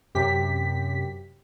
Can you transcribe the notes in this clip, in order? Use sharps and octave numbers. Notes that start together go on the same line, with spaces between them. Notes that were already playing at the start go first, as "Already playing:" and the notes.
F#2 C3 G4 B6